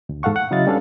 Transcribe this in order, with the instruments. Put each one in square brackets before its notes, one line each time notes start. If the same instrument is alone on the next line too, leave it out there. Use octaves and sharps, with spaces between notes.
[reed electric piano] D2
E2 G#2 A4 F5 F#5 C#6
F#5
C#3 F#3 E4 D#5 F5 A6
G3 C#4 D4 A4 B4 F5